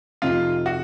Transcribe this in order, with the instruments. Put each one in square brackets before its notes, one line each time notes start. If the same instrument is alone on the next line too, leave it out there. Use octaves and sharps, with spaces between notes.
[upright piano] F2 C3 F3 C4 D#4 [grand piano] F4
[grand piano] F#4